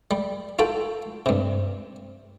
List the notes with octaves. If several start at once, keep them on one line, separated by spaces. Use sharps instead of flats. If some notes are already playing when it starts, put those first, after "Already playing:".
G3
F4 F#4 A4 G5
G2 C3